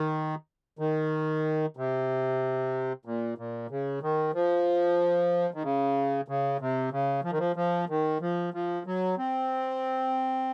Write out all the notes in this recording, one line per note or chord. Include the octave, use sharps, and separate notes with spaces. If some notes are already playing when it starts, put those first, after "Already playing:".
Already playing: D#3
D#3
C3
A#2
A#2
C#3
D#3
F3
D#3
C#3
C#3
C3
C#3
F3
D#3
F3
F3
D#3
F3
F3
F#3
C4